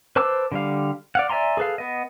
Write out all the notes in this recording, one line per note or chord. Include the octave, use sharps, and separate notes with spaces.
B4 C5 A5 D6 E6
D3 G3 F5
D5 F5 F#5
D5 E5 G#5 A#5 C6
G#4 A4 B4 F5
B3 D#5